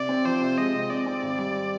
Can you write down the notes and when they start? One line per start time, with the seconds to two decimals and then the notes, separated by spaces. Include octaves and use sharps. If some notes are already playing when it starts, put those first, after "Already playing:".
Already playing: C3 D5
0.09 C4
0.25 F3 C5
0.41 C3
0.58 G#3 D#5
0.75 C3
0.90 C4 D5
1.06 C4
1.23 G#1
1.38 G3